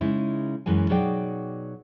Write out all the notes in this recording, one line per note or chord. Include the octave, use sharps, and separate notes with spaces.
C#3 G#3 D#4 E4
F#2 E3 G#3 G#5
B2 F#3 D#4 G#4 D5 G5